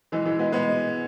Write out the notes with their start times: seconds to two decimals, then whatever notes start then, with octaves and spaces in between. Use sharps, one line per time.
0.12 E3 G#3
0.26 E3 G#3
0.39 G#3 B3
0.52 G#3 B3